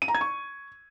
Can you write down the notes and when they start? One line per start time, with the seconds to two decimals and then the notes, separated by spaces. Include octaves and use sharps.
0.02 D#7
0.08 A#5
0.15 G#6
0.21 C#6